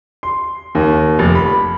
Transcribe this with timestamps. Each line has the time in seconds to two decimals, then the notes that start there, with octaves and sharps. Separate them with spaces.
0.23 C6
0.75 D#2
1.19 F1
1.35 B5